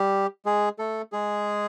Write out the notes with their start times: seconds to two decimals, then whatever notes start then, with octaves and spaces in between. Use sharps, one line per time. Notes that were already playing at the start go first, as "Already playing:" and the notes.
Already playing: G3 G4
0.46 G#3 G#4
0.79 A3 A4
1.12 G#3 G#4